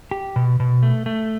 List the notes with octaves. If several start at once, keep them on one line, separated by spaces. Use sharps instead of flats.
G4
B2
B2
A3
A3